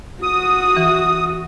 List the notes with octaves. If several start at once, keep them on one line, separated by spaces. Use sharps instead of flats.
F#4 D#6
E3